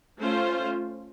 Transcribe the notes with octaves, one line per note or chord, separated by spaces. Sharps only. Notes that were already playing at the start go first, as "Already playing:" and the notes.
A3 C#4 F4 C5